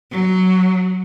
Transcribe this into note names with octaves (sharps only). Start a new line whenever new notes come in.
F#3